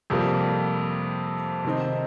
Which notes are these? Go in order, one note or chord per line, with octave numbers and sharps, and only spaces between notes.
F2 C3 G3 A#3
C3 D#3 C4 D#4